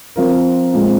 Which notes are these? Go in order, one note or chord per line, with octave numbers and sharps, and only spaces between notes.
F3 C4 F4 A#4
A#2 G#3 C4